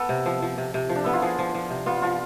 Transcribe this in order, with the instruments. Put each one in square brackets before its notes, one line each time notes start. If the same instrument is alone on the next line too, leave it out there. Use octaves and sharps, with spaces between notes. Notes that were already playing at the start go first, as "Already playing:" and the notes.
Already playing: [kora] B3 [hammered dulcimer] A4
[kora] C3
F3
F3
C3
C3
F3
[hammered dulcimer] D4
[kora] B3 [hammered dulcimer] E4
[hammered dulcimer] F4
[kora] F3 [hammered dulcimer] G#4
[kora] F3
F3
C3
[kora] B3 [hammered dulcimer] F4
[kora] F3 [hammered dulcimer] F4